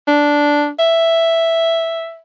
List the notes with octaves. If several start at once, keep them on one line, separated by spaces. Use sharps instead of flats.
D4
E5